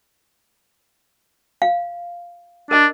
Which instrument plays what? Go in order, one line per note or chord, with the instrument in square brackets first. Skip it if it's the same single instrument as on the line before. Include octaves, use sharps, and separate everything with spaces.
[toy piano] F5
[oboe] D4 [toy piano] A#4 D#5